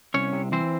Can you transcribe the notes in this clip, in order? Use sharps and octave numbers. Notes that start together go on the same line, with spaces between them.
C2 C#4 C#5
C3
E3 C4 C5